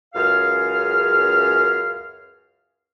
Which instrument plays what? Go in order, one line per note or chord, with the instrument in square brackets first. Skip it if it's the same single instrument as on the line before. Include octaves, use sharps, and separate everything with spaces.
[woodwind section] C#2 F#2 G#4 F5 F6